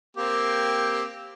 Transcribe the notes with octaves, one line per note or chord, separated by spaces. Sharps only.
A#3 C4 G4